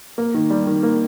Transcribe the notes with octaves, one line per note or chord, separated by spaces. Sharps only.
A#3
D#3
G3
D#3
A#3